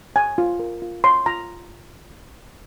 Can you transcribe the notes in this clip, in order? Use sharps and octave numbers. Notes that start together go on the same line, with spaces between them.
C#5 G#5
F4
A#4
F4
C#5 C6
F4 A#5